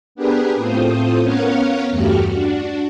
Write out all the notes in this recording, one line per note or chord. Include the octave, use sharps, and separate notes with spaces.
B3 D4 G4 G#4 A#4 B4
A2 A3 C4 F4 C5 D#6
B3 C#4 A#4 C#5 F5 F#5
E2 G2 A3 F#4 G4 F6
D4 F#4